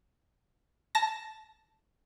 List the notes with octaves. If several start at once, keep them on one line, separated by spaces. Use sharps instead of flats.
A5 A#6